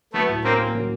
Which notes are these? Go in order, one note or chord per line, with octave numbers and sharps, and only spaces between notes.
F#3 A3 B3
A2
A#3 C4 C#4
A#3
F#3